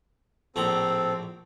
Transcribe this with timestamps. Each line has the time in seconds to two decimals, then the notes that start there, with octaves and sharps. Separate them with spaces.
0.56 A#1 A2 C4 A4 A#5